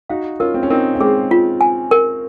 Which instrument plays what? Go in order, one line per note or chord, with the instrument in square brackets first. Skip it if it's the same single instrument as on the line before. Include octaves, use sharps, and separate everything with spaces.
[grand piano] D#4 F#4 [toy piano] F5
[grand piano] C#4 F4 [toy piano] A#4
[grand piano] C4
C#4
[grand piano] C4 D#4 [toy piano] A#4
[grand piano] C#4
[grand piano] G#3 C4 [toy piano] G#4
[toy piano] F4
G#5
A#4